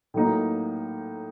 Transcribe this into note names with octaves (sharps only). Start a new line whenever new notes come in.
A2 F#3 A#3 D#4